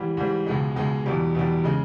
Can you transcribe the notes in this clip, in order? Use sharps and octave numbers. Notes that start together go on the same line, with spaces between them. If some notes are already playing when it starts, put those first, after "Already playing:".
Already playing: G#2 E3 G3
G#2 E3 G3
C#2 B2 G#3 D#4
C#2 B2 G#3 D#4
E2 B2 G3
E2 B2 G3
C#3 G#3 D#4